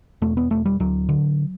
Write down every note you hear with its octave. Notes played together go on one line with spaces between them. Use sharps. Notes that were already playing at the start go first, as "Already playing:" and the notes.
E1 A3
B3
E1 A3
G3
D2 F#3
D3